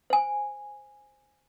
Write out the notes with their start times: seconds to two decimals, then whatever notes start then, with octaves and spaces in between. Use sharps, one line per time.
0.10 C5 G#5